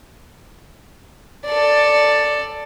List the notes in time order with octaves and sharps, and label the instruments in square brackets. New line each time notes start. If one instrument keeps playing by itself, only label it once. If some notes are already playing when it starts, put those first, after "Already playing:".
[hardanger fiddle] A4 D5